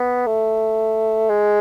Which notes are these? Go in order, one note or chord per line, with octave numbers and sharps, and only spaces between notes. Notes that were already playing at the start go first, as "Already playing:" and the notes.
Already playing: B3
A3
G#3